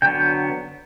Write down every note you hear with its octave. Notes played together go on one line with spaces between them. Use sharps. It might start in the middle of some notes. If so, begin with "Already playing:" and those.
D3 F#3 B3 G5